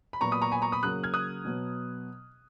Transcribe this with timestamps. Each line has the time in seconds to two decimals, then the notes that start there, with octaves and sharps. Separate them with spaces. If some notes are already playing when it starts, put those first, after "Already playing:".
0.13 B5
0.21 A#2 F#3 B3 A#5 C#6
0.32 B5 D#6
0.42 A#5 C#6
0.52 G#5 B5
0.62 A#5 C#6
0.72 B5 D#6
0.83 C#3 F#3 A#3 D#6 F#6
1.03 F6 G#6
1.14 D#6 F#6
1.45 B2 F#3 B3